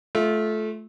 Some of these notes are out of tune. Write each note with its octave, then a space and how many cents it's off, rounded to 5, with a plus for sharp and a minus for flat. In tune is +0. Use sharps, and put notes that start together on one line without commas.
A3 -20 F4 +0